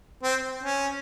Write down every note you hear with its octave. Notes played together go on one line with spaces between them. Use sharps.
C4
C#4